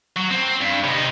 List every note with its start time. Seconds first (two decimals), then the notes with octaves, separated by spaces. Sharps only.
0.16 F#3
0.31 C4
0.61 G2
0.84 C3 D#4